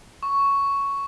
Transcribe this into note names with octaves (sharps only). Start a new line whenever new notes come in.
C#6